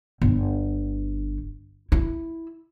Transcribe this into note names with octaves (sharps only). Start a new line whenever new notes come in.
G1
E4